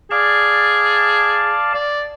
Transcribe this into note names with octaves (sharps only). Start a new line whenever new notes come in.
G#4 D5 F5 A5
D5